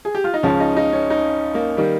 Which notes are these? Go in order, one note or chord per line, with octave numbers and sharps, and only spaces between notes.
G#4
G4
F4
D#4
C#2 C#3 F3 C#4
D#4
D#4
C#4
D#4
A#3
D#3 G3